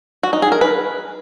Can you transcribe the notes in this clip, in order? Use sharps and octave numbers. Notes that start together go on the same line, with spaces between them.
F#4
D#4
G#4
A#4
B4